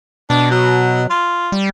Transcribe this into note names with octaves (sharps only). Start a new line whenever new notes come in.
B2 D4
F#3
F4
G3